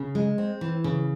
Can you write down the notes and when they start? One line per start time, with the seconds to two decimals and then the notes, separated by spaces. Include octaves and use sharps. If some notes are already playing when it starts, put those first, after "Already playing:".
Already playing: C#3
0.15 G#3
0.38 C4
0.61 E3
0.84 C#3